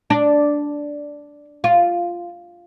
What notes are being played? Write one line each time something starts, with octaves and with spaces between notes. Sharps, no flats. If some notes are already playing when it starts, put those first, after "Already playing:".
D4
F4